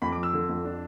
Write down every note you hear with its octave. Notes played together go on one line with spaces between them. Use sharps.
F2 B5
D6
F3
E6
D3
F2
D4